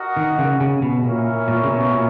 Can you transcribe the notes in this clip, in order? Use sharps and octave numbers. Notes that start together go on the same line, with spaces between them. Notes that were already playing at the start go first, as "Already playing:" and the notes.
Already playing: F#4 A#4 D#5 F#5
D#3
C#3
C#3
B2
A#2 A#3 C#4 E4 A#4 C#5
A#2
C#3
B2
A#2